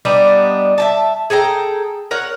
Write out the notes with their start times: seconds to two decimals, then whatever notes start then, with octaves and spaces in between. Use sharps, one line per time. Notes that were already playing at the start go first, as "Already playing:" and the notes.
0.05 G3 B3 D4 D#4
0.78 E5 G5 A5
1.30 G#4 A4 G5 A#5
2.11 A#4 C#5 F#5